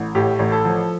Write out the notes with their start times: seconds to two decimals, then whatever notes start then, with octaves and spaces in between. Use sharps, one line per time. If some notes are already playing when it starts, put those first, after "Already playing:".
Already playing: A1
0.15 A2 G4
0.39 A1
0.52 A4
0.65 F3